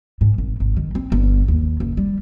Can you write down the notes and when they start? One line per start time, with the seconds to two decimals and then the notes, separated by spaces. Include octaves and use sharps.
0.21 G#2
0.38 G#1
0.60 G#1
0.77 D#3
0.95 C4
1.12 G1
1.48 D#2
1.80 F#1
1.97 G3